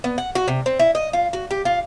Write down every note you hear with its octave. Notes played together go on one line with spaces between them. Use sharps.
B3
F#5
F#4
C3
C4
E4
D#5
F4
F#4
G4
F4